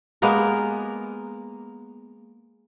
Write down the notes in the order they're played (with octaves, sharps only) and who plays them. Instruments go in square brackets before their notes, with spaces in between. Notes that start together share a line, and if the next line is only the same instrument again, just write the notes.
[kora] G#3 A#3 B3 A#4